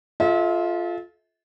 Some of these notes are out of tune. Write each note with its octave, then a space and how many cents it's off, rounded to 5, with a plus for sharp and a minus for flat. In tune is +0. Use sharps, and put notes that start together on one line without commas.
F4 +0 A4 -30 E5 -40